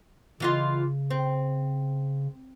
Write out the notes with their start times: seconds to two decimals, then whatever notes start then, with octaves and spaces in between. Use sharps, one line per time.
0.40 C#3 E3 F4 D#5
1.10 C4